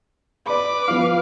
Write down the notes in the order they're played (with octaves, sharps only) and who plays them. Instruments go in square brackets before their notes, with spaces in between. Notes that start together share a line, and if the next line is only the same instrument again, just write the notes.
[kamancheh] B4 D6 [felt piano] D5 B5
[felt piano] F3 B3 E4 [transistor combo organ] F5